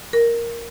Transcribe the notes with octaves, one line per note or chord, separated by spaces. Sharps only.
A#4